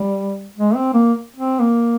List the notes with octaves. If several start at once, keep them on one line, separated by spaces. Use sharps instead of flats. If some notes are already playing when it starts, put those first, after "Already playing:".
Already playing: G3
G#3
C4
A#3
C4
A#3